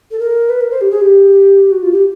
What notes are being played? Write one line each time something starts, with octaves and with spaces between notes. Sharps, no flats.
A4
A#4
B4
A#4
C5
G4
G#4
G4
F#4
F4
G4